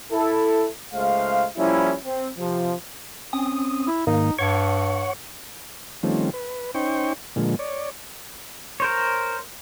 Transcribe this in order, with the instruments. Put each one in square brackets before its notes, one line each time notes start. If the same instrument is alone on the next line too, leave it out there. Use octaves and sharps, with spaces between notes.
[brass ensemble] E4 A4
C#2 G#3 A3 C5 F5
F3 G3 A#3 C#4 E4
C4
C3 F3
[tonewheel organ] C4 C#4 D#6
[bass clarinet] E4
[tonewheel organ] G#2 D#3 A#3 [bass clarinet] D#4
[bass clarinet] G2 [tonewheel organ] C#5 F#5 C#6
[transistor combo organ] D#3 F3 G3 A3 C4 C#4
B4
C#4 D#4 C5 G5 C#6
A#2 D3 F3 G#3
C#5 D5
[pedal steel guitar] A#4 C5 C#5